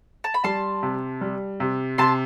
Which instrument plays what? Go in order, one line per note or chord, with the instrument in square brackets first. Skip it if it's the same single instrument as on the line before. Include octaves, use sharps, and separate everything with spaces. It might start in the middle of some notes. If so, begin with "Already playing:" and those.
[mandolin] A5
B5
[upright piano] G3 [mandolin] A5 C6
[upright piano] C3
G3
C3
[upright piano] C3 [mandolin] A5 C6